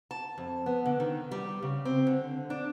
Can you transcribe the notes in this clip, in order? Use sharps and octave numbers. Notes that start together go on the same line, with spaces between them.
A5
F2
B3
D3
D#3
G3
C#3
C4
D3
D4